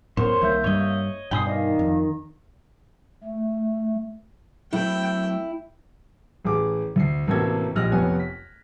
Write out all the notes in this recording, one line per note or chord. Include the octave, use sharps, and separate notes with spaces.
F#2 A2 B3 A#4 C5 C#5 C6
C2 D#3 A#3 E5 G6
G2 G3 C#5 D#5
G2 B2 G5 G#5 B5 D#6 C7
D#3 D5 D#5 F5
F2
A3
F#3 A3 C4 E4 G5
A1 G#4 D6
D2 C7
A1 C3 A#3 F#4 A4 G#6
A#1 G4 D#5 F6 F#6 A#6
F1 F2 B3 C#5 G#5
B6